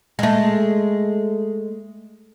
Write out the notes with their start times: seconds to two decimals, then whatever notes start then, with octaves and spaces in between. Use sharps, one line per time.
0.19 G#3 A3